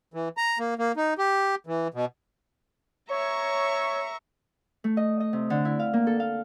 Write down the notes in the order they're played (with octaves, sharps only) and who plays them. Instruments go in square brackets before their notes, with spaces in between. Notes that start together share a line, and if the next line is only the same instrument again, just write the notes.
[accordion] E3
A#5
A#3
A#3
D#4
G4
E3
B2
[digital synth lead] C#5 [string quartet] E5 A#5 C#6
[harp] A3
D#5
D#5
C3
D3
E4
F5
A#3
A4
F5